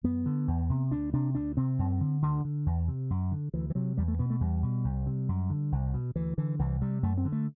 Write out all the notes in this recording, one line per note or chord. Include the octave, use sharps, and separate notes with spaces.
F#2 B3
D3
E2
C3
D2 D4
C3 D4
D2 D4
C3 C4
F#2
D3
D2 D3
D3
E2
C3
F#2
D3
D2 E3
E3
C3 F#3
E2 G3
A3
B2 B3
A3
E2 G3
B2
C2
C3
F#2
D3
C2
B2
D2 E3
D3 E3
C2 E3
C3 G3
F#2 A3
C4
D3
A3